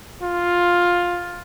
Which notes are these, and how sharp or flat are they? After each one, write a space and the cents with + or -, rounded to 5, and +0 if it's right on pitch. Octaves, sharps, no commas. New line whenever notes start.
F4 +10